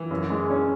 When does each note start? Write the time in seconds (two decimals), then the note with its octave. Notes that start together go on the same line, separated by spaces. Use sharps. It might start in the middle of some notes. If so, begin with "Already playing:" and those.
Already playing: E3
0.11 F#2
0.30 G#3
0.50 C#4